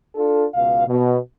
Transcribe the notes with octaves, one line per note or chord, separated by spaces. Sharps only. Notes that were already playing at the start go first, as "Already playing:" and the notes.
D4 F4 A4
C#2 B2 F5
B2